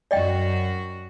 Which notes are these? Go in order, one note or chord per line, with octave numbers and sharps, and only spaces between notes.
F#2 F#4 D5 D#5 G5